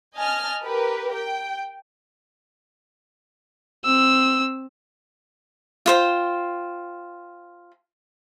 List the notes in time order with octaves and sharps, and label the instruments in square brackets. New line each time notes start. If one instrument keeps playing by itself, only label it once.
[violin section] D#5 G#5 A5 F6
G4 A#4 B4
G5
[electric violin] C4 E6
[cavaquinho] F4 C5 G5